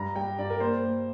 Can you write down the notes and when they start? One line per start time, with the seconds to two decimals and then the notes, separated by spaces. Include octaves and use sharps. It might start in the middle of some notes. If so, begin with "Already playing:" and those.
Already playing: G2 A#5
0.16 G3 G5
0.38 G2 D5
0.50 A#4
0.60 A#3 C5
0.83 A#3